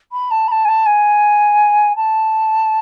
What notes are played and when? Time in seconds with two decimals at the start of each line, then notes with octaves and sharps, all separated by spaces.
0.12 B5
0.30 A5
0.47 B5
0.51 A5
0.64 G#5
0.68 A5
0.85 G#5
1.95 A5